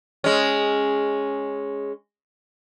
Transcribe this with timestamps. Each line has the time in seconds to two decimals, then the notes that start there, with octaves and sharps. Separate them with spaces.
0.24 G#3 C#4